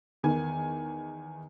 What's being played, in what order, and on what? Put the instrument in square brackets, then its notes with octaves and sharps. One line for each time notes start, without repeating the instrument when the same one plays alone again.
[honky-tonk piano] E2 D#3 G#5